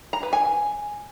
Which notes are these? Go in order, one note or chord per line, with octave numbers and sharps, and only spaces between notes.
A#5
B4
G#5